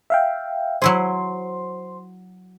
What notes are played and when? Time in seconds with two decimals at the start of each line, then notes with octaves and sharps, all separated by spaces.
0.10 E5 F5 G5
0.82 F#3 E4 G#4 C5 C6